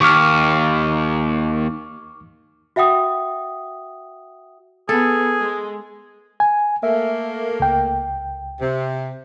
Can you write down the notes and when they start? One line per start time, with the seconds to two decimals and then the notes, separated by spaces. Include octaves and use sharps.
0.01 D#2 C#6 D6 F6
2.76 F#4 E5 F#5 G5 D#6
4.89 B3 G#4 A4
5.39 G#3
6.40 G#5
6.83 A3 A#3 E5
7.60 C#2 G5
8.60 C3